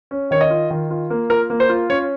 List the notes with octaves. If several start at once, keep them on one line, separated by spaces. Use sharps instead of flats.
C#4
D#3 C#5
D#5
F4
D#3
F4
A#3
F4 A#4
A#3
C5
F4
C#4 C#5